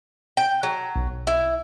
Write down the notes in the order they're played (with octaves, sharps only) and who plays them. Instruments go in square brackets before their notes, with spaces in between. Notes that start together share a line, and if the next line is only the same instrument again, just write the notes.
[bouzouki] G5
F#3
[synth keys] B1
[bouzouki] E4